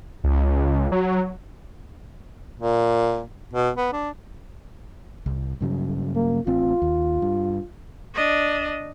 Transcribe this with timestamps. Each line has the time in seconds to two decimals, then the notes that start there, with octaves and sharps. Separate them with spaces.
0.24 C#2
0.92 F#3
2.60 A#2
3.53 B2
3.77 B3
3.93 D4
5.26 C2
5.61 G2 C#3 F#3
6.15 A#3
6.47 A1 C4 F4
6.82 D#2
7.22 G2
8.14 D4 D#5